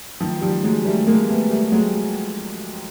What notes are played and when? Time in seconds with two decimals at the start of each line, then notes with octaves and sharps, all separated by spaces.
0.20 D#3 F3
0.41 F3 G3
0.64 F#3 G#3
0.85 G3 A3
1.07 G#3 A#3
1.29 A3 B3
1.50 G3 A3
1.72 F#3 G#3